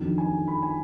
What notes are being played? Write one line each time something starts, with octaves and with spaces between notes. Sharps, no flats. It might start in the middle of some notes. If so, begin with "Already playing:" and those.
Already playing: F2 D#3 F#3 D4
G#5
B5
G#5